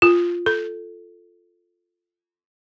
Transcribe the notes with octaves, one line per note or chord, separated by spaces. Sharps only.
F4
A4